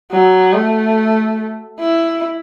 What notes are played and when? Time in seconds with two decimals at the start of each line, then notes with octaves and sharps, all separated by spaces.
0.12 F#3
0.54 A3
1.80 E4